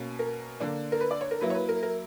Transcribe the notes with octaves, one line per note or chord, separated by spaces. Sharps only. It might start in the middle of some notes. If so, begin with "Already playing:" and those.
Already playing: B2 A#3 C#4
A#4
D3 A#3 D4
A#4
B4
D5
C#5
A#4
F#3 A#3 E4 B4
C#5
B4
A#4
A#4